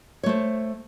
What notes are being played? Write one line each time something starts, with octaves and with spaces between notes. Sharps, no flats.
A3 C5 C#5